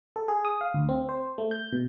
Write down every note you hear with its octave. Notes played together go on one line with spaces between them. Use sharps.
A4
G#4
D#6
F5
D2
C4
C5
A3
G6
B2